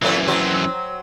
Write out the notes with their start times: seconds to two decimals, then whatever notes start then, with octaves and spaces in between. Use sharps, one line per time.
0.02 F#2 A2 E3 A3 C4
0.28 F#3 C4 C5